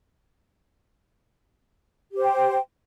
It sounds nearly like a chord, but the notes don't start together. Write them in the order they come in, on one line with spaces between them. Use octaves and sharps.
G4 C5 G5